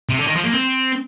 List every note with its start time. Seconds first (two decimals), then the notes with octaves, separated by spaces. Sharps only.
0.09 C3
0.17 D3
0.27 D#3
0.35 F3
0.44 A#3
0.52 C4